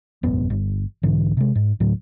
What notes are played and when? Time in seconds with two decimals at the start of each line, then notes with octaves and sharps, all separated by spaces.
0.23 E1 A1 F#2 B3
0.50 G1
1.03 B1 G#2 D3 E3
1.37 C3 G#3
1.55 G#2
1.80 D2 A2 F#3